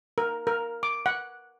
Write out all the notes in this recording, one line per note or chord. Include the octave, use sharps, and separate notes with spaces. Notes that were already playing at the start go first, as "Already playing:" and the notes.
A#4
A#4
D6
F#5